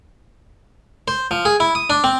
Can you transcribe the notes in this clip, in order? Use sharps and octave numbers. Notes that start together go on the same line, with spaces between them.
C5
F3
G#4
E4
D#6
D4
C4